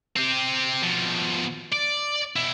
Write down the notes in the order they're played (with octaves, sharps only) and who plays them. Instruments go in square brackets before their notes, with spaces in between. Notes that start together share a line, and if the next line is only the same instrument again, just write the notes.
[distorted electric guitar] C4 G4
B2 F3
D5
B2 E4